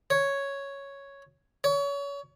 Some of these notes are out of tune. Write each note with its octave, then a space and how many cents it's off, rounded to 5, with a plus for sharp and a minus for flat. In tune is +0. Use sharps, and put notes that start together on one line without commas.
C#5 +0
C#5 +30